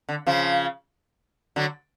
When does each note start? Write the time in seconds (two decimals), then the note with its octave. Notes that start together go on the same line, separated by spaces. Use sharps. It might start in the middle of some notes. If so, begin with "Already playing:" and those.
0.09 D3
0.26 C#3 F3
1.56 D3 F#3